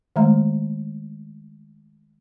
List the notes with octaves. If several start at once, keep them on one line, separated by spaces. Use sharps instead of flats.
D#3 G#3 A3 E5 A#5